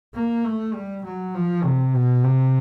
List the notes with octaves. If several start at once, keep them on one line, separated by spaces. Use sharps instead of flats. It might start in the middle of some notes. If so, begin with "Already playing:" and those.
A#3
A3
G3
F#3
F3
C3
B2
C3